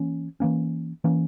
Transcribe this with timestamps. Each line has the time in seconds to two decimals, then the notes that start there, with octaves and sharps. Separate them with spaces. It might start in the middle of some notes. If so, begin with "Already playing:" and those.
Already playing: E3 A#3 C#4
0.40 E3 A#3 C#4
1.04 E3 A#3 C#4